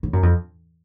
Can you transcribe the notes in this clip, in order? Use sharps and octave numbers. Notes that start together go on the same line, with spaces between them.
A2
F#2
F2